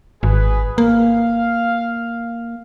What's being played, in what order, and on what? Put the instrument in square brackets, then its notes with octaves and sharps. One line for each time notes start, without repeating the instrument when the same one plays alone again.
[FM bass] G#1 [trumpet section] G#4 B4
[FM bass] A#3 [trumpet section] F5